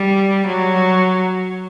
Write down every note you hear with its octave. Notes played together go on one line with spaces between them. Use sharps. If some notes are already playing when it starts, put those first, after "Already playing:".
Already playing: G3
F#3